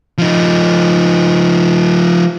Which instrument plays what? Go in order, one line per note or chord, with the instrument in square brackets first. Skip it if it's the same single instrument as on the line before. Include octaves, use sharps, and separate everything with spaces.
[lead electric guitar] F3 D#4